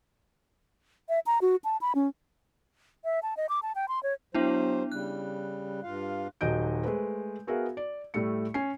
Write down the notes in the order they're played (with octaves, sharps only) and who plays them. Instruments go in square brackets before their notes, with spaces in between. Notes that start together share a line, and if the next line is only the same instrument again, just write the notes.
[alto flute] E5
A#5
F#4
A5
B5
C#4
[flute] E5
A5
D#5
D6
A5
G5
C6
C#5
[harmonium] F#3 C5 [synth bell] B3 D4 E4
[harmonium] C#3 G3 [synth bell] F#6
[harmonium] G2 F4 F5
[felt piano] D#1 F#3 D#4 D#5 G6 D7
G#3 A3 B4 C5
B3 F#4 G#4 A#4 E5 F5
D5
A2 G3 A3 C#7
C#4 G#5 C7